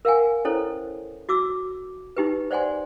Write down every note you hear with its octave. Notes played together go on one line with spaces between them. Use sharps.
A#4 F5 F#5 G#5
C#4 E4 A4 C5 C#5
F#4 D6 E6
D#4 G4 B4
C5 D5 F#5 G#5 C6